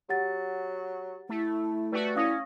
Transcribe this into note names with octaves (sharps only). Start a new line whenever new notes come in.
F#3 G4 F#5 A6
A3 E4
G3 A3 F#4 B4
C#4 E4 F5 D#6 A#6